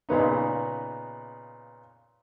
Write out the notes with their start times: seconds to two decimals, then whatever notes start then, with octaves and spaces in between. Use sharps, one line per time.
0.09 A#2 C#3 B3 D#4